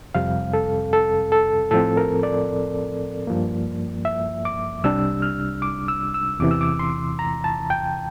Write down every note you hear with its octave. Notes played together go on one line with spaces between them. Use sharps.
F2 C3 G3 C4 F5
A4
A4
A4
A2 F3 C4 A4
A#4
D5
G2 F3 A#3
E5
D6
C2 C3 G3 D4 E6
F6
D6
E6
E6
E2 C3 E3 D6
E6
D6
C6
A#5
A5
G5